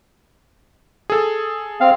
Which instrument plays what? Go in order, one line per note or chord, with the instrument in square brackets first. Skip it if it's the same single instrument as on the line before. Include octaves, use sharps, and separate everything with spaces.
[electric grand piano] G#4 A4
[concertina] C4 F5